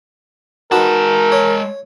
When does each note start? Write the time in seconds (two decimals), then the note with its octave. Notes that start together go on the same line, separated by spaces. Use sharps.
0.72 G#3 D#4 F#4 A#4 B4 A5
1.32 C#5